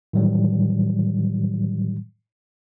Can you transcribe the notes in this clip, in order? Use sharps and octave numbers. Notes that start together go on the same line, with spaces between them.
A2 D#3 E3 F#3 G3